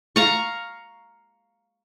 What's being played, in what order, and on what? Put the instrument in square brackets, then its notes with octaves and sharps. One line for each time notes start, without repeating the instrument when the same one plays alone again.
[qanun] F5 A#5 C#6